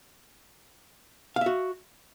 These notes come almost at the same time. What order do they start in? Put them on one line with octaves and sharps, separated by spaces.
F5 E5 F#4